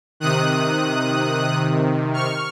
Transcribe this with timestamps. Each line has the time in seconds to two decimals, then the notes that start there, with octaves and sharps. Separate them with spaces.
0.20 C3 D#3 D#6 F#6
2.14 C#6 F6